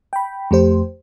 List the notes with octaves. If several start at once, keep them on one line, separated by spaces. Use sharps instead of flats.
G5 B5
F2 A3 G4 C5